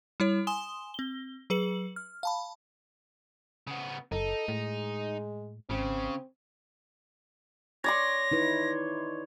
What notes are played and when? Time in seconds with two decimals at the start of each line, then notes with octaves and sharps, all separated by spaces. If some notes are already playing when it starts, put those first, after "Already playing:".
0.20 G3 E4 C#5
0.47 G#5 C6 D#6 E7 G7
0.94 C4 G7
1.50 F#3 G#4 B4 C#7 F#7
1.96 F6
2.23 F5 A5 B5
3.67 C#3 B3
4.12 F#1 D#4 A4
4.48 A2 G#3
5.70 G#1 C#3 C4
7.84 C#5 D5 C6 A#6
8.32 D#4 E4 B4